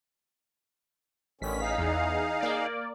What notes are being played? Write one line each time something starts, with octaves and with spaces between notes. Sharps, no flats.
A1 D3 D#3 C#4 B6
D#4 G#4 F5
E2
A#3 D5